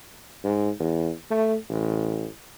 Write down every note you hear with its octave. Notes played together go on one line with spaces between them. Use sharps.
G#2
E2
A3
A1